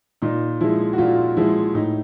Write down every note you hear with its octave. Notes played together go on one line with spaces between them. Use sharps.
A#2 D#4
F3 G#3 E4
F#4
A#2 F4
F3 G#3 E4
A2 D#4